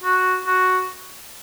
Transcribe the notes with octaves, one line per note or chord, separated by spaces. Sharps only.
F#4
F#4